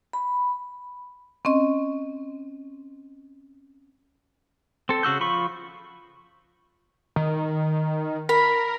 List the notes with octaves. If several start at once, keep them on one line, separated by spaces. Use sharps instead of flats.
B5
C4 C#4 D#5
C4 A4
C#3 F#4 E6 G6
F3 F4 B5 C#6
D#3
A#4 B5